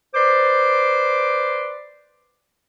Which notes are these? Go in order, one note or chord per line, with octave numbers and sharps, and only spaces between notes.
B4 C5 D5 C6 D6